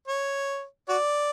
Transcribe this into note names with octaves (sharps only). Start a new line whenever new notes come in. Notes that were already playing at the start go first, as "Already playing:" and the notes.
C#5
F#4 D5